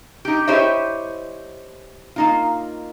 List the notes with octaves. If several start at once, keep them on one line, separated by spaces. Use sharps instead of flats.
D#4 G4
E4 G4 C5 C#5 D#5 E5
A#3 D#4 F4